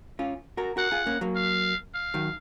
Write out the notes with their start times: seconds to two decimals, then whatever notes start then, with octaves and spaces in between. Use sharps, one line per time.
0.19 C#4 F4
0.57 F#4 A#4
0.77 F#4 A#4 F#5
0.92 F4 G#4
1.06 A#3 C#4
1.21 F#3 A#3
1.35 F5
1.94 F5
2.14 D#3 F#3